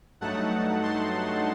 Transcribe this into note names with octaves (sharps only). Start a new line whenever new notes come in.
G2 F#3 A3 D#4 F#5 A5
A5 C6